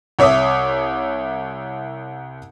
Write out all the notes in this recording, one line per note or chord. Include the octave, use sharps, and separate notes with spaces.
C2 C#5 E5 D6 D#6